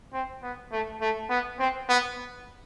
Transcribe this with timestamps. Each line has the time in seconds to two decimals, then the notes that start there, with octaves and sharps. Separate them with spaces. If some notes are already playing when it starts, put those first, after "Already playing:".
0.13 C4
0.43 B3
0.72 A3
1.01 A3
1.30 B3
1.59 C4
1.89 B3